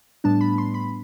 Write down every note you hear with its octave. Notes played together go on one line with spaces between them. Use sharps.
A2 G3 B3 D4 A5
B5
C6
B5